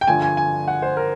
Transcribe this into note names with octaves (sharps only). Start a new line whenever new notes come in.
G5
G2 D3 F3 G#5
G#5
G#5
F#5
C5
A#4